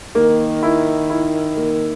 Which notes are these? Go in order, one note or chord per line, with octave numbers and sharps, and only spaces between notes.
D#3 A#3
E4
E4
A#3